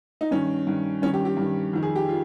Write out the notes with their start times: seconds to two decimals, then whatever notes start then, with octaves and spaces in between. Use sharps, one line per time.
0.21 D#4
0.31 G2 D#3 C#4
0.67 G2 D#3
1.02 G2 C#4
1.05 D#3
1.14 G4
1.25 G4
1.37 G2 D#3
1.73 F2 D#3
1.83 G#4
1.96 G4
2.09 F4